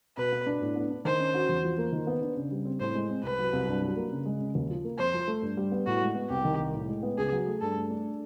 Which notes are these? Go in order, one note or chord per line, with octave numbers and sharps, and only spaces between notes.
B2 B4
B3
D4
A2
B3
D4
D#3 C5
C#4
F#4
E2
F3
A#3
D#3
B3
D4
C#3
G3
C4
A2 C5
G#3
C4
C2 B4
F#3
C2
G2
F#3
A#3
C#3
G#3
C#3
D#2
F3
A#3
F2 C5
F3
A3
G2
G3
B3
A2 F#4
G#3
B3
C2 G4
D#3
C2
A2
G#3
B3
C#2 G#4
F#3
A3
G2 A4
A3
D4